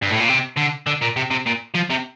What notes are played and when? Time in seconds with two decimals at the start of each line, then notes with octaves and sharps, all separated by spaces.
0.02 G2
0.10 A2
0.19 A#2
0.28 C3
0.57 D3
0.87 D3
1.02 A#2
1.16 C3
1.31 C3
1.46 A#2
1.74 F3
1.90 C3